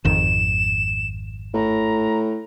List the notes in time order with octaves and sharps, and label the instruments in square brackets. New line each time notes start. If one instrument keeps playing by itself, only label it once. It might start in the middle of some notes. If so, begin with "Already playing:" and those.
[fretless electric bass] G#1 F2 D#3 [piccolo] E7
[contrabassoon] A2 [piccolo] A#5